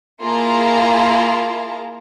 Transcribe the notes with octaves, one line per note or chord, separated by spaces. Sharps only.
A#3 E4 F4 G#4 A5 A#5